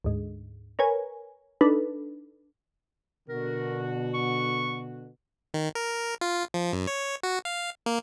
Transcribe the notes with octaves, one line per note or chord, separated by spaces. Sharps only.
D2 G#2
A#4 B4 C#5 G#5
D4 D#4 A4 B4
B2 D3 F#4 A#4
C#6
D#3
A#4
F4
F3
F#2
C#5
F#4
F5
A#3